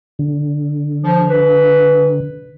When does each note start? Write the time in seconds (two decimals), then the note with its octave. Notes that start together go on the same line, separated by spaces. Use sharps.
0.19 D3
1.04 F3
1.30 B4